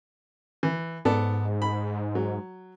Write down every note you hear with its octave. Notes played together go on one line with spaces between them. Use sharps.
E3
G#2 B3 A4 D5
B5
F#3